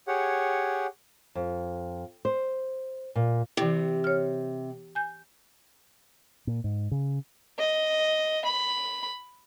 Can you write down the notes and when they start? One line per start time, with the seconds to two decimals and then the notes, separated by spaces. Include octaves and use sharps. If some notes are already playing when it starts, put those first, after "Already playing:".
0.08 G4 G#4 C#5 F#5
1.35 F2
2.25 C5
3.15 A#2
3.57 C3 E3 E4 G5
4.04 C#5 F6
4.95 G#5 G6
6.47 A#2
6.64 G#2
6.91 C#3
7.58 D#5
8.45 B5